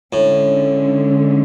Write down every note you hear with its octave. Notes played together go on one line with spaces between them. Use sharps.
A2 D3 G#3 C#4